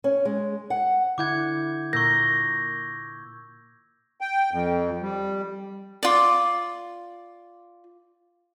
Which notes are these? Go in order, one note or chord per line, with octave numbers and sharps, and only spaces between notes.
C#4
G#3
F#5
D3 E4 F#5 D6 G6 G#6
A#2 A#3 A#4 C#6 E6 G6 A#6
G5
F2
G3
F4 D5